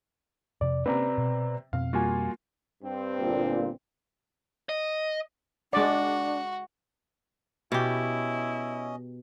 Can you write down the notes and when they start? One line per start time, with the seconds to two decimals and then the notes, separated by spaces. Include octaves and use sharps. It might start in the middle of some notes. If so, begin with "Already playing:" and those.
0.61 F2 C3 D5
0.86 C3 A#3 C4 C#4 B4 D5 A#5
1.18 B2
1.73 F2 B2 C4 F5
1.93 G3 A#3 F4 F#4 G#5
2.82 G2 C4
3.19 G1 A#2
4.69 D#5
5.73 G#3 D4 F#4 D5
7.72 B2 C#4 E4 G4 D#5